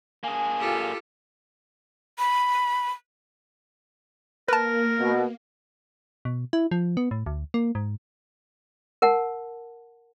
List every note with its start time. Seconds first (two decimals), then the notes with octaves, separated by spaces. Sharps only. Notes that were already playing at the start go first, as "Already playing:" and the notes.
0.24 A#3 G#4 G#5
0.60 F4 G4 A4
2.19 B5
4.48 A#3 A#4 B4 A5
4.99 B2
6.25 B2
6.53 E4
6.71 F3
6.97 B3
7.11 A2
7.26 D2
7.54 A#3
7.75 G#2
9.02 A#4 F#5 A5